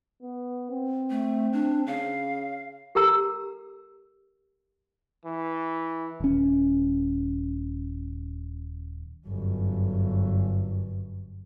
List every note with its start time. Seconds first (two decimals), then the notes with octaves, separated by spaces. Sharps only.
0.22 B3
0.71 C4
1.10 A3
1.53 D4
1.87 C#3 F5
2.95 G4 A4 A#4 A#5 E6
5.25 E3
6.20 D#1 C#4
9.27 G1 F#2